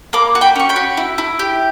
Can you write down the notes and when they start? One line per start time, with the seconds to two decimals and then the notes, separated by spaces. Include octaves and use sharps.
0.13 A#3 B5 D6
0.35 F#4
0.41 G5 B5
0.56 C#4 C#6
0.69 G5 B5
0.76 F#4
0.97 E4
1.18 E4
1.39 G4